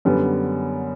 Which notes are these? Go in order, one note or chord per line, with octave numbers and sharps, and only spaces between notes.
F#2 D3 G3 B3